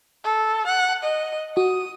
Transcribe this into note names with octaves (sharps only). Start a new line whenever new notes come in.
A4
F#5
D#5
F#4 D#6